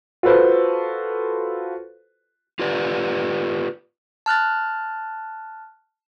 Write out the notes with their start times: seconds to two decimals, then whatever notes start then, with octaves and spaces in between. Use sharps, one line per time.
0.23 F4 F#4 A4 B4 C5
2.59 F4 G4 B4 D5
4.26 A5 F6 F#6 A6